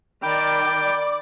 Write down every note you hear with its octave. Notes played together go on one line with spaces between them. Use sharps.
D#3 D5 G5 B5 D6